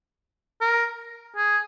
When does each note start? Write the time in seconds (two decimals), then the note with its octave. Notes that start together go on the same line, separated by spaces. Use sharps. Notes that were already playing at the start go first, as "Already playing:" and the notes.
0.61 A#4
1.36 G#4